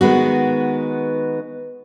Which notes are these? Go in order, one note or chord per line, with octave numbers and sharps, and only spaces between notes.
D#3 G#3 B3 F#4